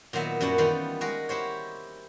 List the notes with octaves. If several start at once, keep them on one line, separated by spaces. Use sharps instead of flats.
A#2 D#3 F#3 B3 E5
F#2 F#3 G3 E4 C#5
D#3 E3 G3 B3 F4
G#3 F#4 A#4
E4 G4 C5 C#5